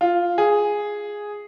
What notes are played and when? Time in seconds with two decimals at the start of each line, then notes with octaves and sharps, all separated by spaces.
0.01 F4
0.38 G#4